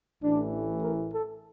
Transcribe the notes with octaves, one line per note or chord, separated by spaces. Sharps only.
A1 A2 E3 D4
A#4
A4